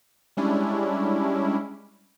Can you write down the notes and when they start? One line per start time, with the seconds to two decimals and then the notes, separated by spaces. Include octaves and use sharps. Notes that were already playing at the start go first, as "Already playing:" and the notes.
0.37 G3 G#3 C#4 D4 E4